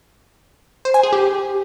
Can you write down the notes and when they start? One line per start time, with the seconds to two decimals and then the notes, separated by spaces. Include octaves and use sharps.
0.85 C5
0.94 G#5
1.03 G#4
1.13 G4